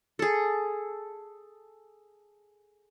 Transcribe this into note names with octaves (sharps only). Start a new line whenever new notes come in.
G#4 A4